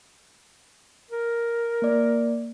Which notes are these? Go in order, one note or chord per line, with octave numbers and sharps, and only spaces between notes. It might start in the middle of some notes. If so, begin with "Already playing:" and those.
A#4
A#3 D5